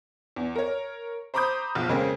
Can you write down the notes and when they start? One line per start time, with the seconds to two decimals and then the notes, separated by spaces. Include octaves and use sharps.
0.36 E2
0.56 A#4 C#5
1.34 C5 A#5 B5 D6 D#6 G6
1.75 F#1 B1 F3
1.89 F2 C#3 G#3 A#3 C4